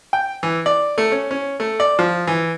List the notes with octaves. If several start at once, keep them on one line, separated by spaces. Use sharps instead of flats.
G5
E3
D5
A3
C#4
C#4
A3
D5
F3
E3